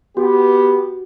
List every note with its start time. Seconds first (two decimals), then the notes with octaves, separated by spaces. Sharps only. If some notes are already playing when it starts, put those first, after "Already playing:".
0.17 B3 F#4 G4